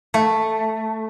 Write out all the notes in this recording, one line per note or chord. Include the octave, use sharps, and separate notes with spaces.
A3